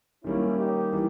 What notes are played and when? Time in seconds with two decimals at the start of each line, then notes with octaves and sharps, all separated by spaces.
0.24 D#3 G3 A#3 C#4 E4
0.58 D#4 G4
0.93 E3 G3